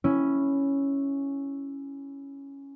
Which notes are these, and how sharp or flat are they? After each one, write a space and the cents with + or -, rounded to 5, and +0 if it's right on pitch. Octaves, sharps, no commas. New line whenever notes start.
C#4 +0 E4 +0